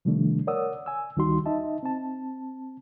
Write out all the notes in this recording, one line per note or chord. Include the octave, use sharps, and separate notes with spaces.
C3 D#3 F3 G3 A3 D4
A#4 C#5 D5 F#5 D#6 E6
G#5 E6
D2 D#3 G3 D#4 F#4 C6
D#4 D#5 E5 A5
C4 A5